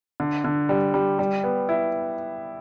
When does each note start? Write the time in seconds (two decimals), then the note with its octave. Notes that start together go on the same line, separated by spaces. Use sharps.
0.20 D3
0.44 D3
0.69 G3
0.94 G3
1.19 G3
1.44 B3
1.69 E4